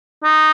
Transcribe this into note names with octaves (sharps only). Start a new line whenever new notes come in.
D#4